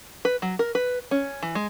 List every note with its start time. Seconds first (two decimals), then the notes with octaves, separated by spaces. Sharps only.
0.25 B4
0.42 F#3
0.59 A#4
0.75 B4
1.11 C#4
1.43 E3
1.55 G#3